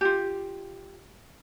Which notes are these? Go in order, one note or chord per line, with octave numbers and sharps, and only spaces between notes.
F4 G4